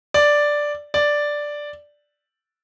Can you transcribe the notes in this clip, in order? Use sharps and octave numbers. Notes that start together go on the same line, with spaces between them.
D5
D5